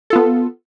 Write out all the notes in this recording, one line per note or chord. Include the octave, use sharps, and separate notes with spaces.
B3 F4 A4